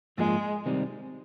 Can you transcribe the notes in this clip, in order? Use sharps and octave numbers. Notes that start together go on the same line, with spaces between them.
G#2 F3 G#3 A#3 F4 G#4
C3 D#3 G3 C4 D#4